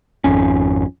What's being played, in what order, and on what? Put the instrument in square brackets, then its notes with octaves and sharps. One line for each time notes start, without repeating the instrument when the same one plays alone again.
[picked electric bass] G#1 F2 C#4